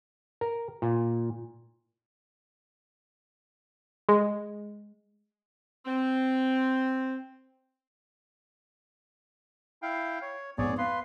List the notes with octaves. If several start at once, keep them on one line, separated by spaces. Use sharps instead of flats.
A#4
A#2
G#3
C4
E4 F5 G5
C#5
A#1 F2 G#2 B3 G#4 C#5 D5
B4 F5 C6